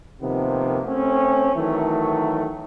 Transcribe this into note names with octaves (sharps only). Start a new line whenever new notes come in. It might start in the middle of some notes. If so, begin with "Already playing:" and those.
C3 D#3 F3 A#3 B3
A3 C4 C#4
D#3 E3 F#3 A3